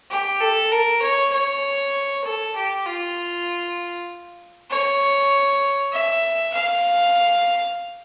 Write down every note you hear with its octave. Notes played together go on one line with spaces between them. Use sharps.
G4
A4
A#4
C#5
C#5
A4
G4
F4
C#5
E5
F5